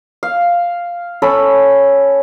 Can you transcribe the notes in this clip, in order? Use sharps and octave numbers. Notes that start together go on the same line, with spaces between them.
F5
C#4 A4 B5